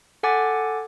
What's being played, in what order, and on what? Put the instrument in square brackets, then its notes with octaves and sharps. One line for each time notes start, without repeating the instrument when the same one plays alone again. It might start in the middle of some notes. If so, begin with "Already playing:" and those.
[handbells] A4 F#5 G#5 D6 A6